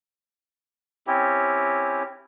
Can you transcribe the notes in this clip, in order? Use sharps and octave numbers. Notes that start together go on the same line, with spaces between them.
C4 C#4 E4 G4